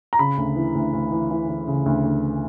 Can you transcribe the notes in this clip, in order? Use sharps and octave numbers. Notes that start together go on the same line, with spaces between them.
A#5
C#3 B5
D2
E3
D2
D2
E3
E3
E3
C#3
D2
D2